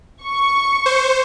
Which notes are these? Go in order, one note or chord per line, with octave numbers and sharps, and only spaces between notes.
C#6
C5